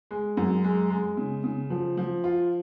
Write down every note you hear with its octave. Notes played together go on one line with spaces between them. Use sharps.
G#3
F#2
G#3
G#3
C#3
C#3
F3
F3
F4